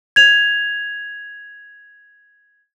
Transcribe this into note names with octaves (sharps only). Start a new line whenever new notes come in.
G#6 F7